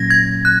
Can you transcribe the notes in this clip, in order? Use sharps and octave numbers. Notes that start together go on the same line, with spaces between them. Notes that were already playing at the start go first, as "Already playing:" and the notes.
Already playing: A#2 F#3 A#3 C#4 G#6 A#6
G#6
F#6